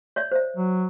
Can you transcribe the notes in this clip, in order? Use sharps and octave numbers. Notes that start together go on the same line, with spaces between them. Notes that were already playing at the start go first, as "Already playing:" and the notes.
C#5 D5 E5
C5 E5
F#3